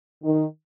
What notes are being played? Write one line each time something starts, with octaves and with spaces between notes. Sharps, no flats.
D#3